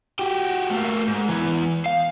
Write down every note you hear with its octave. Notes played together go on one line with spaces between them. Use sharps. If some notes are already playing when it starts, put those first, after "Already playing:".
F#4 G4
A3 A#3
G#2
E3 B3
F5